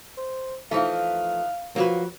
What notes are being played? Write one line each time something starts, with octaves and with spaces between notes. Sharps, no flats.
C5
E3 F3 A3 D#4 F5
F3 F#3 A#3 F#4 B4